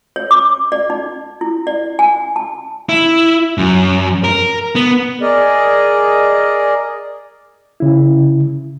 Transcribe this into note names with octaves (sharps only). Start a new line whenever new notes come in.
C#5
D6
D5
D#4
E4
D5
G#5
A5
E4
F#2
A#4
B3
G#4 A#4 D5 D#5
C#3 E4